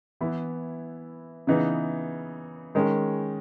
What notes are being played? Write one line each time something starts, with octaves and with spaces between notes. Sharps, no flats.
E3 B3 E4
C#3 E3 B3 D#4
D#3 G#3 C#4